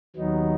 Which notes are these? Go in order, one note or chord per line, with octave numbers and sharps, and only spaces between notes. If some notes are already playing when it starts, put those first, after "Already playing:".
D#2 D#3 F#3 B3 D#4